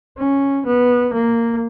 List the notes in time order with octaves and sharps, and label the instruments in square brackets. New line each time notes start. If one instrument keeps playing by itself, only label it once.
[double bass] C#4
B3
A#3